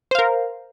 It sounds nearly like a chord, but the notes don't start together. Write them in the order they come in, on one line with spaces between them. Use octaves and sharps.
C5 F5 A#4